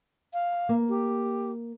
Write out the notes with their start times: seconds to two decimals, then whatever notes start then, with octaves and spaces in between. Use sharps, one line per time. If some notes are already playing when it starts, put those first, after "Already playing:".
0.34 F5
0.69 A#3
0.89 G4